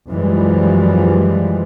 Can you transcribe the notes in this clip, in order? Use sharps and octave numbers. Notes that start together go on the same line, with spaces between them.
F#2 E3 F3 G3 G#3